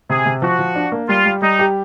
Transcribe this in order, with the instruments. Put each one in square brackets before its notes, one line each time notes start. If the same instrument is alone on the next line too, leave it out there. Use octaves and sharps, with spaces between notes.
[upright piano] C3 [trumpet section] G#4
[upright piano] C3
[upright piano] F3 [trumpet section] F#4
[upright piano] F3
D4
A#3
[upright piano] G3 [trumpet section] F4
[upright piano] G3
[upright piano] G3 [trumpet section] D#4
[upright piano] G4